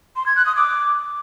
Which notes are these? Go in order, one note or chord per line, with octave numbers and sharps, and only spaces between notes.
C6
G#6
F#6
D#6
D6